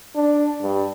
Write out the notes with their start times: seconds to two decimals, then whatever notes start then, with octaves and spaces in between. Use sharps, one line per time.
0.16 D4
0.62 G2